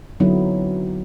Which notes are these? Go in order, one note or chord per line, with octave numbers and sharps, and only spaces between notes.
D3 F#3 B3 C4 D#4 E4